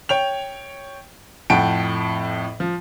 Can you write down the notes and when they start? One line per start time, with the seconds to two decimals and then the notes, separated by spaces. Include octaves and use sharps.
0.09 C#5 G5 F7
1.50 F2 A2 F#5 G5 A5 D7
2.60 F3